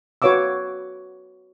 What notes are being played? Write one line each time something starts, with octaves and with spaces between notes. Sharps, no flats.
F#4 B4 C#5 F5 D6 E6